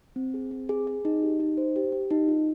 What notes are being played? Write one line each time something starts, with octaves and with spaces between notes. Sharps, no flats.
C4
G#4
C4
G#4
G#4
D#4
G4
D#4
C5
G4
G4
D#4
F4